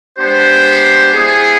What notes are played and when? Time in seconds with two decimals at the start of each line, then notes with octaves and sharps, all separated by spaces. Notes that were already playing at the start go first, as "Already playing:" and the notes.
0.19 G#3 B3 D4 G4 C5
1.14 B3 E4 G#4